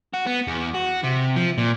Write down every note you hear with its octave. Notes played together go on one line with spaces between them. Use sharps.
F#4
B3
E2
F#4
C3
F3
A#2